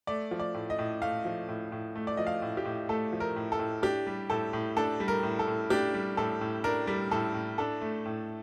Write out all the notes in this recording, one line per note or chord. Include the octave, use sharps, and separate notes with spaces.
A3 D5
F3
D5
A2
D#5
A2
A3 F5
F3
A2
A2
A3
D5
F3 D#5
F5
A2
G4
A2
A3 A4
F3
A#4
A2
A4
A2
D4 G4
G3
A2 A4
A2
D4 A4
G3
A#4
A2
A4
A2
D4 G4
G3
A2 A4
A2
D4 A#4
G3
A2 A4
A2
D4 A4
A3
A2